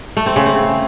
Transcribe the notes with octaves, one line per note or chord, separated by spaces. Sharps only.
A3
C4
C#3
C4